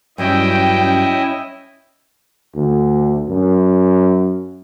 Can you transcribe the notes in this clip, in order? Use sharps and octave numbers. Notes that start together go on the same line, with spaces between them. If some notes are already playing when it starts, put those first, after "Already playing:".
G2 F#3 G3 C#4 E4 D#5 G5
D2
F#2